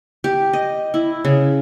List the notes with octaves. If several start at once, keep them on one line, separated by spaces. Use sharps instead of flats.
G4
D#5
E4
C#3